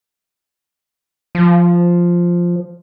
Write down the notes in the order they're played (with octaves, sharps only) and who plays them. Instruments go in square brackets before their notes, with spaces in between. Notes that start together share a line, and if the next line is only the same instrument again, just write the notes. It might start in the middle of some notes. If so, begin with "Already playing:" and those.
[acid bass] F3